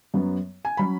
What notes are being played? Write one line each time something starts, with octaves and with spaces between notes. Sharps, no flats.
F#2 F#3 B3
G#5
F#3 C#4 B5